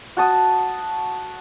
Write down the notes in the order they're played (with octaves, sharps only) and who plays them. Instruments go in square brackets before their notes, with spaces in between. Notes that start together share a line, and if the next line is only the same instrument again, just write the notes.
[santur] F#4 A5 D#6